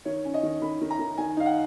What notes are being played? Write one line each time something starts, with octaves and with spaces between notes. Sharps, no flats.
D#3 C#5
C#4
D#5
D#3
D#3 B5
D#3
A#5
D#3
D#3 G#5
D#4 F5
F#5